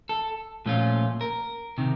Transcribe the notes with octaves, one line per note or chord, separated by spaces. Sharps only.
A4
A#2 F3 A3 C#4 F4
A#4
C3 D#3